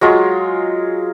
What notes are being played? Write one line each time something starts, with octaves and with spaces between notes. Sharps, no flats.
F#3 G#3 F4